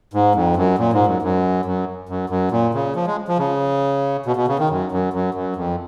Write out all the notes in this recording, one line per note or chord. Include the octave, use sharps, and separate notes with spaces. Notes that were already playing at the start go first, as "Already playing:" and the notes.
G#2
F2
F#2
A#2
G#2
F#2
F#2
F#2
F#2
F#2
A#2
C#3
F3
G#3
F3
C#3
B2
B2
C#3
D#3
F#2
F#2
F#2
F#2
F2